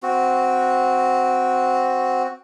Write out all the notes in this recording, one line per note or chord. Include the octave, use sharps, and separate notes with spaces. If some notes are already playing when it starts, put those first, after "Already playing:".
C4 F#4